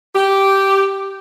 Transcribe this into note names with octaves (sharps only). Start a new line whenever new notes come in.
G4